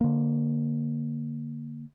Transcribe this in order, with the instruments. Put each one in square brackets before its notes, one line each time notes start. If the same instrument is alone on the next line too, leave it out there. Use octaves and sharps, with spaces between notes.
[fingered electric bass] D3 A#3